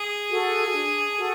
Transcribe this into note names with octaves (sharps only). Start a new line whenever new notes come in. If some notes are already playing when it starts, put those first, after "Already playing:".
Already playing: G#4
F#4 A4
D4
F#4 A4